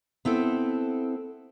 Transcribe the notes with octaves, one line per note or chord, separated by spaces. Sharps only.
B3 C4 E4 A4